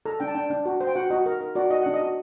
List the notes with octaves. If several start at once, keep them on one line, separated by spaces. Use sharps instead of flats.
A4 A#5
D4 G5
A5
D4 G5
D4
F#4
C5
G5
F#4 F#5
F#4 D#5
A#4
A#4
F#4 D5
F#4 D#5
D4 F#5
D#5
F#4